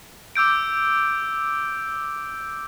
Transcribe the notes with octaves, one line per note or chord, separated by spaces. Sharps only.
D6 E6 G6 D7